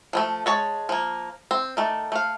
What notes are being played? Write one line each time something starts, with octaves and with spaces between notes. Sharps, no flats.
F3 G#3 A3
G#3 C#5 A5
F3 A#3
C4
D#3 A3 D5
A3 F5